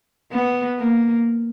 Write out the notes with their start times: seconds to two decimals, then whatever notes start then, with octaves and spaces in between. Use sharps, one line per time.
0.32 B3
0.79 A#3